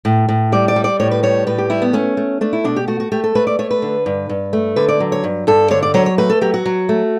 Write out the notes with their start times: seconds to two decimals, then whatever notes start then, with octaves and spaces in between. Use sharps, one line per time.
0.05 A2
0.29 A2
0.52 G3 D5
0.68 D5
0.76 G3
0.84 D5
1.00 A2 C#5
1.11 B4
1.23 G3 C#5
1.47 A2 B4
1.58 G4
1.70 G3 E4
1.82 B3
1.93 A3 C#4
2.17 A3
2.41 A3 D4
2.53 E4
2.64 B2 D4
2.76 G4
2.88 A3 F#4
3.00 F#4
3.12 A3 G4
3.24 A4
3.35 A3 B4
3.47 D5
3.59 A3 C#5
3.71 B4
3.82 D3
4.06 G2
4.29 G2
4.53 A3
4.76 D3 B4
4.88 D5
5.00 F#3
5.12 C#5
5.24 G2
5.47 G2 A4
5.71 D3 C#5
5.83 D5
5.94 F#3 C#5
6.06 C#5
6.18 A3 B4
6.30 A4
6.41 F#3 G4
6.54 F#4
6.66 F#3
6.89 A3